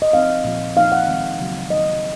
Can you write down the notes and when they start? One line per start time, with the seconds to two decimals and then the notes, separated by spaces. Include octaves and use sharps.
0.02 D#5
0.13 F3 C4 D#4 F5
0.44 A#2 F3 A#3 F4
0.77 F3 A#3 D#4 F5
0.92 F#5
1.07 D#3 G#3 C4
1.39 C#3 F#3 A#3
1.70 D#3 A#3 D#4 D#5